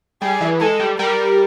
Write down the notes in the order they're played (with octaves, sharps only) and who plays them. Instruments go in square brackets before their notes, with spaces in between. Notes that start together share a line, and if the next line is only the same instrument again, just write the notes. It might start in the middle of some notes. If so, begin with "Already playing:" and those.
[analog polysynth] G3 [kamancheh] G#4
[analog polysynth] E3
[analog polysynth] G#3 [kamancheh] A4
[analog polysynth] G3
[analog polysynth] G3 [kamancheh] A#4